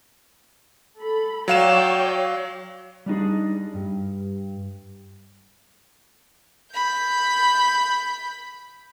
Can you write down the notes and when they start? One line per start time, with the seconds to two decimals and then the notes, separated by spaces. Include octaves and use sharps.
0.98 A4 B5
1.48 F#3 C#5 D5 F5 G5 E7
3.06 G3 D4 D#4 G#4
3.74 G2
6.73 B5 G6